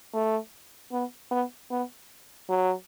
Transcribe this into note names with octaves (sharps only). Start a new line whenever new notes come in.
A3
B3
B3
B3
F#3